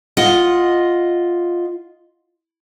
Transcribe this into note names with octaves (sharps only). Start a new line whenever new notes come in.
F4 D#5 F#5